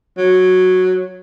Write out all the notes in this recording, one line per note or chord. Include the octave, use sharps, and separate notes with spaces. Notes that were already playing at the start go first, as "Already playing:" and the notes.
F#3